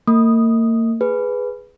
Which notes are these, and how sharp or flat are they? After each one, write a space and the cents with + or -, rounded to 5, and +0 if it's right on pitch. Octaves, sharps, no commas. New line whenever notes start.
A#3 -40 D#6 +0
G#4 +0 B4 +5